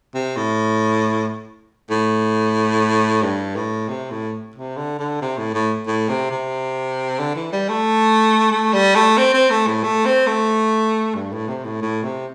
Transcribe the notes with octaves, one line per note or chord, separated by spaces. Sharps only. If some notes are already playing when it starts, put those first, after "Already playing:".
C3
A2
A2
G2
A2
C3
A2
C3
D3
D3
C3
A2
A2
A2
C3
C3
D3
E3
G3
A3
A3
G3
A3
C4
C4
A3
A2
A3
C4
A3
G2
A2
C3
A2
A2
C3